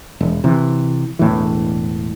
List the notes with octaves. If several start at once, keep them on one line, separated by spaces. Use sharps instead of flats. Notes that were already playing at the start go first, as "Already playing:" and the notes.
E1
C3 E3
E1 A2 E3